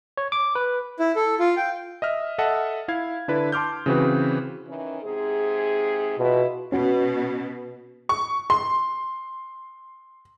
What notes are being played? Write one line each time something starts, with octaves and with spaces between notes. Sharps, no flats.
C#5
D6
B4
E4
A4
F4
G5
D#5 E5 F6
A4 D#5 E5 F#5 A5
E4 F5 G#6
D3 D4 E4 A4 B4
A5 C6 D6 F6 G6
C#3 E3 C4 F#4 B4
D#3 E3 C#4
G#2 C3 G#4
B2 E4 F4 B4
B2 C#4 F#4
C#6
C6